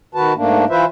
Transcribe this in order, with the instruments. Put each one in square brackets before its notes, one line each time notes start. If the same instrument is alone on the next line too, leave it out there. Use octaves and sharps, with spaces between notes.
[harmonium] D#3 F#4 B4 A5
G#2 A3 A#3 D4
E3 F4 B4 C5 E5